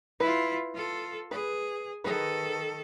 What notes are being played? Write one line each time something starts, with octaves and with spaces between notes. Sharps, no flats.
E4 F4 B4
F4 A4
G#4 B4
D#3 G#4 A4 B4